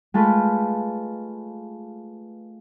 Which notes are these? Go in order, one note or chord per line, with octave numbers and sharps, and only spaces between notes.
G#3 A3 F4 A4 B4